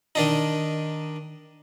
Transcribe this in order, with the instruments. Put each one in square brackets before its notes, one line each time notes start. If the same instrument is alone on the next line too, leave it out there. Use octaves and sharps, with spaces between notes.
[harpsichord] D#3 D4 D#4